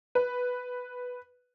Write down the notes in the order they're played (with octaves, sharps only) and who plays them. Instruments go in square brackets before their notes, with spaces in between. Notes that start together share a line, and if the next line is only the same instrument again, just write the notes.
[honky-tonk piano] B4